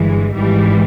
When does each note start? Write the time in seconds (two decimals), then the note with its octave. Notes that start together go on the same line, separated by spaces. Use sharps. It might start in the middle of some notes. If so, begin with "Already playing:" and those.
Already playing: G1 G2 E3 G#3
0.35 G#1 G#2 E3 G3